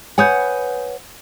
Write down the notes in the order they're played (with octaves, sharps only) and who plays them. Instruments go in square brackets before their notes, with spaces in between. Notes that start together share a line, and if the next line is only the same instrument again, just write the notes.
[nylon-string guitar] B4 C#5 F#5 [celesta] G#5 D#6 G6